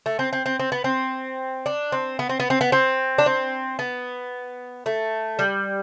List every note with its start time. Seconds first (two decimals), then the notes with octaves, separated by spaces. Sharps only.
0.06 A3
0.19 C4
0.33 C4
0.46 C4
0.59 C4
0.72 B3
0.84 C4
1.66 D4
1.92 C4
2.19 B3
2.29 C4
2.40 B3
2.50 C4
2.61 B3
2.72 C4
3.18 D4
3.26 C4
3.79 B3
4.86 A3
5.39 G3